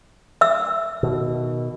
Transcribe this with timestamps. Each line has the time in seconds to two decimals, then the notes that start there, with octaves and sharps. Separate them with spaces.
0.41 E5 E6
1.03 B2 D#3